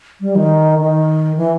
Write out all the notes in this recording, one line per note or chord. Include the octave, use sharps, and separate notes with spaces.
G3
D#3
D#3
E3